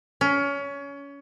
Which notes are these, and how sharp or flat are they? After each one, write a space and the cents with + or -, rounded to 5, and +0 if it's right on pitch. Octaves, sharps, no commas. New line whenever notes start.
C#4 +25